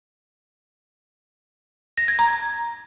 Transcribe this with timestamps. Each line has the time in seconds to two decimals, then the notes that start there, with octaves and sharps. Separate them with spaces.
1.97 A#6
2.08 G#6
2.19 A#5